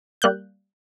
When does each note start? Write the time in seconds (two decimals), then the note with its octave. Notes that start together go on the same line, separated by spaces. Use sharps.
0.22 G3 A#3 F#6 G6